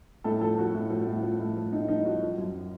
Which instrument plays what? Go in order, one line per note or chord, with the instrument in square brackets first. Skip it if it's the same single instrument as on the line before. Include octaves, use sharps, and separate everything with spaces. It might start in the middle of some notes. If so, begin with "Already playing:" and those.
[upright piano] A2 A4
F3 A4
F3 F#4
A2
F3
A2
F3
A2
F3
A2 D#4
F3 D#4
F3 F#4
F3
F#2